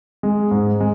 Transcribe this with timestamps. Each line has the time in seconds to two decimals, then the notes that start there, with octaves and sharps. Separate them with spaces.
0.23 G#3
0.51 G#2
0.80 G#3